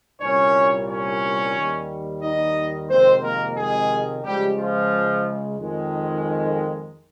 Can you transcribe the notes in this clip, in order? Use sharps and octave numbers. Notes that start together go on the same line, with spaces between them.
C2 A#2 G3 C#4 C#5
C#4 C#5
D#2 D#3 G3
D#4 D#5
F2 C3 D#3 G#3 C4 C5
A#3 A#4
G#3 G#4
C#2 C#3 F3 G3 G#3 G4
F3 F4
F2 D#3 G#3